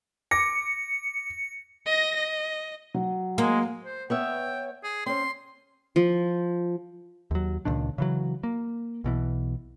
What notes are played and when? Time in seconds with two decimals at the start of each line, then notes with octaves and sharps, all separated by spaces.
0.31 D6 A#6 C#7
1.86 D#5 A#6
2.16 D#5
2.95 F#3
3.38 G#3 A#3
3.85 C5
4.10 B3 C#5 E5 G5
4.83 G#4
5.06 C4 C#4 C6
5.96 F3
7.31 D#2 F#3
7.65 C#2 A#2 D#3 D4
7.98 C#3 E3 F#3
8.43 A#3
9.04 B1 B2 E3